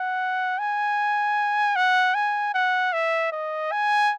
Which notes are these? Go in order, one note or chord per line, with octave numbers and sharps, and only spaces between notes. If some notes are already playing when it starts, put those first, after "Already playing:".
Already playing: F#5
G#5
F#5
G#5
F#5
E5
D#5
G#5